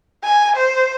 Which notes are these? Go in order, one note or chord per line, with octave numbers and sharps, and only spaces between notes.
G#5
C5